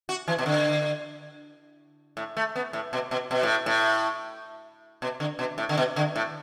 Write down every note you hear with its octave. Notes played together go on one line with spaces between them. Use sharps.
F#4
E3
B2
D3
A2
A3
B3
A2
B2
B2
B2
A2
A2
B2
D3
B2
A2
D3
B2
D3
A2